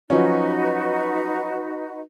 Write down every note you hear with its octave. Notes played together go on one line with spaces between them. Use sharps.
F3 F#3 C#4 D#4 F#4 B4